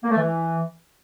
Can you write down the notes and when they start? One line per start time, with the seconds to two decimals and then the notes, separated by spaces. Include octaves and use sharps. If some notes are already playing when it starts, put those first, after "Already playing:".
0.03 A#3
0.10 A3
0.17 E3